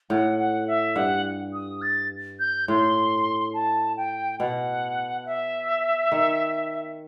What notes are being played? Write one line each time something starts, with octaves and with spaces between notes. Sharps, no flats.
A2 F#5
F#5
E5
G2 F#5
D#6
A6
G6
A2 C6
A5
G5
B2 F#5
E5
D#3